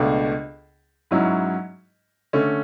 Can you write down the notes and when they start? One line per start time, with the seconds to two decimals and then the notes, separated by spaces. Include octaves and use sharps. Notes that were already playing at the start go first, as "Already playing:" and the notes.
Already playing: C#2 B2 A3 D4
1.11 G#2 F#3 C#4 E4
2.33 D3 A3 C#4